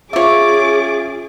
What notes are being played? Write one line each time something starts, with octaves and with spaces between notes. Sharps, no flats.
C#4 F4 G#4 C#5 D5 E5 D6